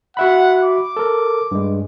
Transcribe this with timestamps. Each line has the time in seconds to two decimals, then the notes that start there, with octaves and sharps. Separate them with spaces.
0.17 F#4 E5 F#5 B5
0.64 D6
0.97 A4 A#4
1.51 G2 G#3